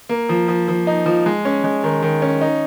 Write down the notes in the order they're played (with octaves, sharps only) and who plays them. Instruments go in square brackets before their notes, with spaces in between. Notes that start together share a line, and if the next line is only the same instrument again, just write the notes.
[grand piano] A#3
F3
F3
F3
D#4
F3
G#3
C#4
G#3
D#3
D#3
C#4
D#4